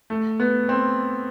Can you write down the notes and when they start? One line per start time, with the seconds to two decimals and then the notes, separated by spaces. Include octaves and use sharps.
0.10 A3
0.40 B3
0.69 C4